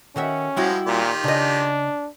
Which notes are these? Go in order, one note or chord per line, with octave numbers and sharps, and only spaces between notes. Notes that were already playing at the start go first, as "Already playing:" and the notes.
D#3 C#4 F#4 E5
F3 G3 G#3 E4 F#4
A#2 D#3 F4 G4
C#3 D4 D#5